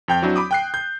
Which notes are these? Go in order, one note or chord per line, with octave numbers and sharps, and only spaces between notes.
F2 G5 G6
F#3 C4 D4 E4 F#4
B5 D6 D#6
G5 F#6 C7
G6